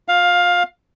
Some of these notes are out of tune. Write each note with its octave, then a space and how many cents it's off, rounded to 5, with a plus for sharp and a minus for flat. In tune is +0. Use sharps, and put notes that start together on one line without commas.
F4 +35 F5 +15